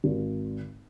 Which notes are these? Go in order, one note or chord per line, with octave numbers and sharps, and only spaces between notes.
G#1